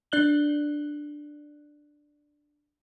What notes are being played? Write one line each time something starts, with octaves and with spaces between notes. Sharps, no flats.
D4 D5 F#6 F#7 G7